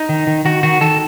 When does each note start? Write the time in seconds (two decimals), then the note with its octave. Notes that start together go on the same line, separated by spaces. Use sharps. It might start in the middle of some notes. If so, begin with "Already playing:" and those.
Already playing: D#4
0.09 D#3
0.27 D#3
0.45 D#3 F#4
0.63 D#3 F#4
0.81 D#3 A4